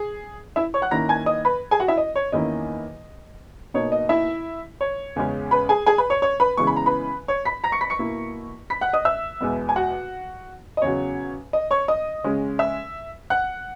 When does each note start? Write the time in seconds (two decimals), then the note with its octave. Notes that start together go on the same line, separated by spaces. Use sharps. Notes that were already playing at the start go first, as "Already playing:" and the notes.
Already playing: G#4
0.56 E4 E5
0.74 C#5 C#6
0.82 F#5 F#6
0.91 D#3 A#3 C#4 E4 A#5 A#6
1.09 G#5 G#6
1.26 D#5 D#6
1.45 B4 B5
1.71 G#4 G#5
1.80 F#4 F#5
1.88 E4 E5
1.97 D#5
2.16 C#5
2.32 E2 D#3 A#3 C#4 E4 D#5
3.74 B2 A#3 D#4 C#5
3.92 D#5
4.09 E4 E5
4.81 C#5
5.16 E2 C#3 G#3 C#4
5.51 B4 B5
5.69 G#4 G#5
5.86 G#4 G#5
5.98 B4 B5
6.10 C#5 C#6
6.22 C#5 C#6
6.40 B4 B5
6.57 C#3 E3 G#3 B3 C#6
6.67 B5
6.76 A#5
6.86 B4 B5
7.28 C#5 C#6
7.45 B5 B6
7.64 A#5 A#6
7.72 C#6 C#7
7.81 B5 B6
7.90 C#6 C#7
7.99 B2 A#3 E4
8.70 B5 B6
8.81 F#5 F#6
8.93 D#5 D#6
9.05 E5 E6
9.41 E2 B2 G#3 B3
9.69 G#5
9.76 F#4 F#5
10.77 D#5
10.82 E2 C#3 F#3 C#5
11.53 D#5
11.71 C#5 C#6
11.88 D#5 D#6
12.24 C#3 G#3 C#4
12.59 E5 E6
13.30 F#5 F#6